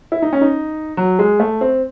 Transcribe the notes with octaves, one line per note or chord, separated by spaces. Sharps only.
E4
D#4
C#4
D#4
F#3
G#3
A3
C4